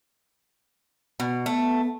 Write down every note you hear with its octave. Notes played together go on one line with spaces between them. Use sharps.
B2
A3 B3